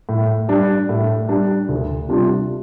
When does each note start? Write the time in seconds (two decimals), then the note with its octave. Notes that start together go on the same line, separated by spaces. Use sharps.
0.09 A2
0.48 G3 D4
0.89 A2
1.29 G3 D4
1.69 D2
2.09 C3 G3 D4 F4